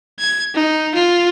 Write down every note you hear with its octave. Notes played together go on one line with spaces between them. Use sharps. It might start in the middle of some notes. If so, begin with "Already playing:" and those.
G#6
D#4
F4